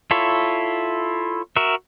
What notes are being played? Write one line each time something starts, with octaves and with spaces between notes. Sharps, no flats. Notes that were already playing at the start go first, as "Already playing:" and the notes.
E4 F4 A4 C#5 E5
F#4 A#4 E5